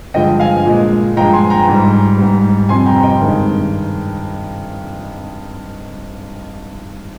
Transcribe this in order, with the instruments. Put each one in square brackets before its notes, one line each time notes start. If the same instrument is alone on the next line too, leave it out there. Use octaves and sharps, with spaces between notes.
[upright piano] G2 D3 F3 G#3 D#5 G5
F5 G#5
A#2 G#3
G2 F3 G#3 G5 A#5
G#5 C6
G5 A#5
G#2 G3
G#2 G3
F2 C3 G3 G#5 C6
G5 A#5
D#5 G5
G2 D#3 G#3